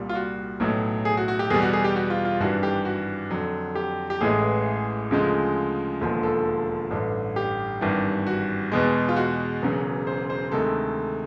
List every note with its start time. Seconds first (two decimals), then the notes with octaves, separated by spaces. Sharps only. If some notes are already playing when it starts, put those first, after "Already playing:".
Already playing: C2 A#2 G3
0.09 F4
0.15 F#4
0.60 B1 A2 F#3
1.05 G#4
1.17 F#4
1.28 F#4
1.39 G4
1.50 E2 B2 G3 G#4
1.62 F#4
1.73 G#4
1.84 G4
1.96 F#4
2.10 F4
2.25 F4
2.40 G#1 G2 E3 G3 F#4
2.63 G4
2.85 F#4
3.31 F2 D3 F#3
3.75 G4
4.10 G4
4.21 A1 A2 E3 G#3 G#4
5.11 D2 C#3 F3 G#3
6.01 E1 D#2 D3 F3 G#3
6.23 A4
6.91 A1 G2 D3
7.36 G4
7.81 G#1 G2 E3 G3
8.27 F#4
8.72 E2 B2 G#3
9.09 F4
9.16 F#4
9.62 E1 E2 C#3 F#3
10.07 C5
10.30 C5
10.52 D2 C3 D#3 G#3 A4